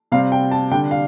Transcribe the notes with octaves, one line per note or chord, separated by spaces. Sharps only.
C3 G3 C4 F5
G5
A5
D3 G3 D4 G5
F5